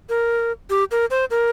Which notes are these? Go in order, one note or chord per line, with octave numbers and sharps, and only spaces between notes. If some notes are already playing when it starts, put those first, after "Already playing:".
A#4
G4
A#4
C5
A#4